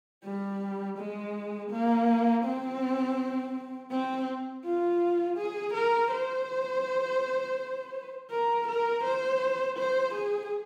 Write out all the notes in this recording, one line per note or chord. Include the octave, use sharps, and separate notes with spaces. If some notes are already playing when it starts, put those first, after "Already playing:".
G3
G#3
A#3
C4
C4
F4
G#4
A#4
C5
A#4
A#4
C5
C5
G#4